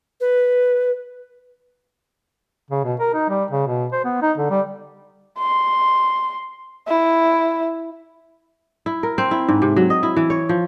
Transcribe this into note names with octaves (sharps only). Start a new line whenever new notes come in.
B4
C#3
B2
A#4
D#4
G3
C#3
B2
C5
B3
D#4
D3
G3
C6
E4
E4
A#4
C4
E4
G#2
C3
F#3
D#5
E4
E3
C#5
F3